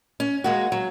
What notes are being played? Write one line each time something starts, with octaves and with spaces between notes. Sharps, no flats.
C#4
G#3 A#3 F#4
F#3